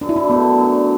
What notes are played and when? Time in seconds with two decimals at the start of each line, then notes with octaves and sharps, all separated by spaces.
0.01 F#2 D4
0.09 E4
0.16 D4
0.30 D3 A3 B3
0.58 F#2